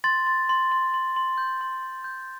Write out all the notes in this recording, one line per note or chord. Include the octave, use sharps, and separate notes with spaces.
C6 A6
C6
C6
C6
C6
C6
G6
C6
C6
G6